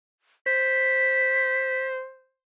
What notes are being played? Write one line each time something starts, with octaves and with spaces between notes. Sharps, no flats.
C5 B6